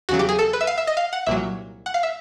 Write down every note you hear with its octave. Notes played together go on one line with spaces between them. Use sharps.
E2 C#3 F#3 F#4
G4
G#4
A4
B4
E5
F5
E5
D#5
F5
F#5
C2 A#2 F#3 E5
F#5
F5
E5